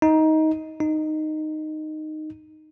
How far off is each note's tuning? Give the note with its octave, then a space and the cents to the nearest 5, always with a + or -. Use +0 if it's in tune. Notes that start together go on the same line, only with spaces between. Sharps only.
D#4 +15
D#4 -10